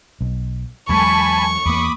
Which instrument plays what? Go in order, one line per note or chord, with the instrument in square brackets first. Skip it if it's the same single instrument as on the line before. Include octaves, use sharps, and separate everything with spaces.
[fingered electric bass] B1
[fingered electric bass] E2 F#3 G#3 [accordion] G#5 A5 B5 [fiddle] C#6
[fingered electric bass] E2 A#3 [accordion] B5 D6 D#6